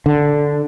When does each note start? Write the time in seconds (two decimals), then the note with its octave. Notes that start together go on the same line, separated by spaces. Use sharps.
0.06 D3